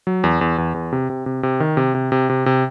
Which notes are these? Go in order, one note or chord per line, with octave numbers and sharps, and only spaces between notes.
F#3
E2
E2
E2
E2
C3
C3
C3
C3
D#3
C3
C3
C3
C3
C3